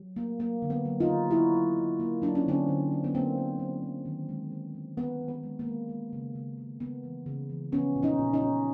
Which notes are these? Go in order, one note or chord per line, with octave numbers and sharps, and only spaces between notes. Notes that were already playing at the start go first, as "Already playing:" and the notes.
Already playing: F#3
A3 A#3
F#3 A#3
D3
B3
F#3
D#4 F4
D3
A#3 E4 F#4
F#3
F#3
A#3
F#3 D4
C#4
D3 C4 D4
D3
F#3
B3
F#3 A#3 C4
A#3
F#3
F#3
D#3
G#3
G#3
G#3
D#3 B3
D#3
B3
G#3
A#3
G#3
G#3
C#3
C#3
C#3
C#3 B3
E3
C#3
E3
F3 B3 C#4
A#2
C#4 D#4
A#2
C#4 D#4
A#2